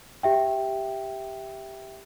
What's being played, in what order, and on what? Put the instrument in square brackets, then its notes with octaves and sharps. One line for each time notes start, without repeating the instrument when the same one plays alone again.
[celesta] G4 E5 G5